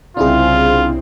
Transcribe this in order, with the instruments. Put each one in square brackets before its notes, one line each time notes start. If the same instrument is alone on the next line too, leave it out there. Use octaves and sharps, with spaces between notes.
[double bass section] C2 C#3 C4 [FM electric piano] D4 E4 G#4 [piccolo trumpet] F4